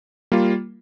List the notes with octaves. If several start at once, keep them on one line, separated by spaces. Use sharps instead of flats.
G3 A#3 F4